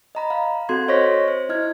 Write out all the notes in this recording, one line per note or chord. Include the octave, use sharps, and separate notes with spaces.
D#5 A#5 B5
F5
C4 F#4 A4 C6 G#6
C5 C#5 D#5 C#6 A#6 B6
C5
E4 D#5 F6 G#6